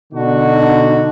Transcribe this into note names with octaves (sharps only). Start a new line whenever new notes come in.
B2 D3 D4 D#4 F#4